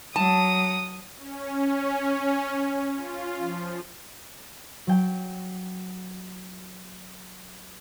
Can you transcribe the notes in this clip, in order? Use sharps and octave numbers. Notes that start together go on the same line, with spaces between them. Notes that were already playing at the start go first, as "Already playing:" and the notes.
F#3 A5 D#6
C#4
F4
F3
F#3 G5